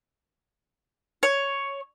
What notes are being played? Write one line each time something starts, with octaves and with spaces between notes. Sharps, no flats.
C#5